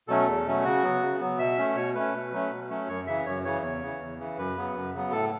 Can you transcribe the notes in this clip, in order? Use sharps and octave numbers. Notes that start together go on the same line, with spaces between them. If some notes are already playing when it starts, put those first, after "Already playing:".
B2 F#3 A3 C#4 A4
E2
B2 F#3 A3 C#4
C#3 F#4
F#3 B3
C#3
F#3 B3
B2 E5
A3 C#4
B2 C#5
A3 C#4 B4
B2
F#3 A3 C#4
B2
F#3 A3 C#4
F#2 C#5
C#3 E3 E5
F#2 C#5
C#3 E3 C#5
E2 C#5
C#3 E3
E2
C#3 E3
F#2 B4
C#3 F#3 B3
F#2
C#3 F#3 B3
A2 A4